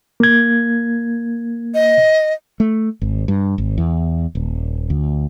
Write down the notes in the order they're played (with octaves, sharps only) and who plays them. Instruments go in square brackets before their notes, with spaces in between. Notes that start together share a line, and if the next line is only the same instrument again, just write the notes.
[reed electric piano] A#3 G#6
[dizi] D#5
[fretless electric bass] A3
G#1
G2
G#1
E2
D#1
D2